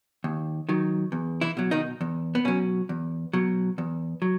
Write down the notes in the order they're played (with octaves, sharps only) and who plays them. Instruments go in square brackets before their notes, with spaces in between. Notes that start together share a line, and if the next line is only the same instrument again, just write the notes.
[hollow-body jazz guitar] D#2
D#3 F#3
E2
E3 E4
B2 F#3
D#3 D#4
E2
B3
B2 F#3 C#4
E2
B2 F#3
E2
F#3